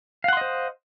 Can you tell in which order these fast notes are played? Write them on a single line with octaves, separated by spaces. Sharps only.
F5 F#5 C6 D#5 C5